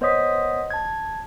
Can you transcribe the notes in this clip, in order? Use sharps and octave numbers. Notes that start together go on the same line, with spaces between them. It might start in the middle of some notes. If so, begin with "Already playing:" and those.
B3 C5 C#5 D#5 D#6 B6
A5 G#6